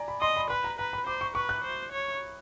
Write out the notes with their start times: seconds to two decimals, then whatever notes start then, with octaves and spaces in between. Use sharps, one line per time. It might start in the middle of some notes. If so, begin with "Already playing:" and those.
Already playing: D5 G#5 A#5
0.08 B5
0.21 D#5 C6
0.36 B5
0.50 B4 B5
0.64 A#5
0.79 B4 A#5
0.93 B5
1.06 C5 D6
1.21 C#6
1.35 B4 C#6
1.49 F#6
1.64 C5
1.92 C#5